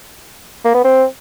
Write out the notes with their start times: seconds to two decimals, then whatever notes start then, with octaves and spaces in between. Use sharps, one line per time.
0.65 A#3
0.75 B3
0.84 C4